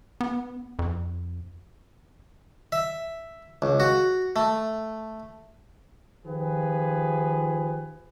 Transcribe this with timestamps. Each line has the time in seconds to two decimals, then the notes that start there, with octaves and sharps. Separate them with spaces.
0.21 B3
0.79 F2
2.72 E5
3.62 C#2
3.80 F#4
4.36 A3
6.26 D#3 F3 F4 G4 G#4 B4